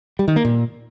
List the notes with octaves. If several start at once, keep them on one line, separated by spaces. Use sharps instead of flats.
G3
D#3
A#3
A#2